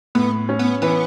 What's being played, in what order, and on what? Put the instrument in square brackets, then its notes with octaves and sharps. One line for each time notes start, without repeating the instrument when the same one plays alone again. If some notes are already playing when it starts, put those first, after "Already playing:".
[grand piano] A2 [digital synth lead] B3
[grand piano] C#4
[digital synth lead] B3
[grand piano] E3 [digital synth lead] B3